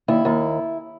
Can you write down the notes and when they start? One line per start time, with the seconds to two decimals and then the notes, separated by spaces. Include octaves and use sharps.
0.08 D#2 E4
0.25 D#2